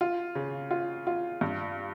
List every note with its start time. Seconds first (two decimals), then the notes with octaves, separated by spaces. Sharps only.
0.01 F4
0.35 C#3
0.71 F4
1.07 F4
1.41 G2